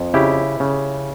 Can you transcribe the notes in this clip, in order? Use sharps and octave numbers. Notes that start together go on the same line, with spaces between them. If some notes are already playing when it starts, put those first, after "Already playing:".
Already playing: F2
C#3 E4 G4
C#3